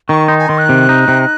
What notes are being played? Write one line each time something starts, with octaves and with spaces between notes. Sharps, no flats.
D#3 C#6
D#4 C6
G#5
D#3 C6
F#6
C3
D#4
C3